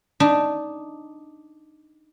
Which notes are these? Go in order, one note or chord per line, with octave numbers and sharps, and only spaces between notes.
D4 D#4